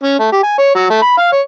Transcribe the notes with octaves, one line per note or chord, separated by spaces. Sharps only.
C#4
A3
G4
G#5
C#5
F#3
A3
B5
F5
C#5